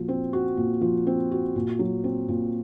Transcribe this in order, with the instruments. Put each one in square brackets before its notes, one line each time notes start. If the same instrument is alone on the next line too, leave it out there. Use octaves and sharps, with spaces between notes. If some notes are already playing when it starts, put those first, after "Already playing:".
Already playing: [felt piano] A#2 F3 F#4
C4
F#4
A#2
F3
C4
F#4
A#2
F#3
C4
A#2